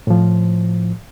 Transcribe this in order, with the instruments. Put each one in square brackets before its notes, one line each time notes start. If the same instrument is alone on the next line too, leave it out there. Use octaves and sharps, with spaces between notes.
[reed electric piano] A2 F3